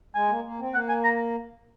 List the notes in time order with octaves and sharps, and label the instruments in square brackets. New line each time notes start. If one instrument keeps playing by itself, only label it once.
[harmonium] G#3 [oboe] G#5
[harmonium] A#3
A#3
C4
[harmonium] A#3 [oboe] F#5
[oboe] G#5
A#5